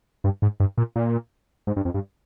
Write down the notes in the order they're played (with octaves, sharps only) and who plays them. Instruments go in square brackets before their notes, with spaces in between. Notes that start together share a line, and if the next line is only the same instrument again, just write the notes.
[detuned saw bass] G2
G#2
G2
A#2
A#2
G#2
G2
F2
G2